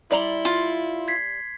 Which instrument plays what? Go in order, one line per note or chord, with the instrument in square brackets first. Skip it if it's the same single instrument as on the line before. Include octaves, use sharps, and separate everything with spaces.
[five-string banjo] G3 D5 A#5 [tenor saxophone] E4 [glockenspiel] C6 F#7 G7
[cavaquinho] F4
[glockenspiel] G#6 B6 C7